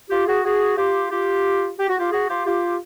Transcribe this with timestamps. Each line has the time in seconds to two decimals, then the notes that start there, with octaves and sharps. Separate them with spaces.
0.10 F4 G4
0.27 F#4 G#4
0.44 F#4 G#4
0.77 F4 G4
1.11 F4 G4
1.79 G4
1.89 F#4
1.99 F4 G4
2.12 F#4 G#4
2.29 F4 G4
2.46 F4 G4